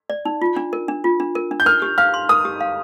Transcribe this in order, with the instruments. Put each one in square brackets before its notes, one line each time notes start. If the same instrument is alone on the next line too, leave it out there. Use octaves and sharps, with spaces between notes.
[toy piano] D5
D#4
F4
D4
A#4
D4
F4
D4
A#4
D4
[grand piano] G6
[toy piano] A#4 [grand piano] F6
[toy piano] G4
[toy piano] F5 [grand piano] F6
[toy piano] C6
[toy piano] A#4 [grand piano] D#6
[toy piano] G4
F5